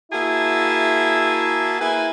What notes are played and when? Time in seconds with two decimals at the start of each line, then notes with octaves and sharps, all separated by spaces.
0.12 A#3 E4 F#4 G#4 E5 A5
1.79 A#3 E4 G#4 B4 G#5